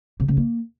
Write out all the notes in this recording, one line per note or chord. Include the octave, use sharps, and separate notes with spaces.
C3
C#3
A#3